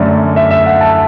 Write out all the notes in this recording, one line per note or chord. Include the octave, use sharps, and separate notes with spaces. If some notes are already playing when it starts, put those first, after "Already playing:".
Already playing: F#2 D3 A3 D5
E5
E5
F#5
A5